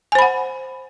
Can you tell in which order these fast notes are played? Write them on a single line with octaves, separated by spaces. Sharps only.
G#5 C5 B5 F#5